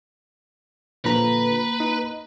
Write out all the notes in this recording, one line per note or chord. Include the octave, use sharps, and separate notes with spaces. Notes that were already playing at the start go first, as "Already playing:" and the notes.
A#2 D3 F3 A#3 B4 A#5
D#4